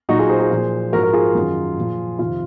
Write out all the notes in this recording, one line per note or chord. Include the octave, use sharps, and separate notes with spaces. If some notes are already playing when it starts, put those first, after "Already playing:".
A#2 F#3 D#4 F#4
F4 G#4
G#4 C5
G#4 C5
A#2 F3
G#2 F3 F#4 A#4
A#4
F4 G#4
F#2 D#3 F#3
A#2 F3
F2 C3 D#3 F4